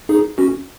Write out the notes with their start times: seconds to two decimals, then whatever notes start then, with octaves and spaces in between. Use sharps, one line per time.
0.09 D#4 G#4
0.38 C#4 F#4